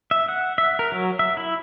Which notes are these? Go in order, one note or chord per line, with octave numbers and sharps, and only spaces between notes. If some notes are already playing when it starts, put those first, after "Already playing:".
E5
F#5
E5
A#4
F#3
E5
E4